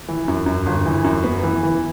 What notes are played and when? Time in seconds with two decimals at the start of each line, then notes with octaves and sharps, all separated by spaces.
0.08 E3
0.28 F#2
0.46 F#2
0.66 G1
0.86 E3
1.04 F#2
1.24 B3
1.43 E3
1.63 E3